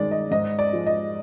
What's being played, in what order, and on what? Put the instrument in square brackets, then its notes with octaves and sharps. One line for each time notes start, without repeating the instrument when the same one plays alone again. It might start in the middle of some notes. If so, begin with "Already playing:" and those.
Already playing: [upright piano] G2 D#3 G#3 D5
D#5
G#2 D#5
D5
F3 G#3
D#5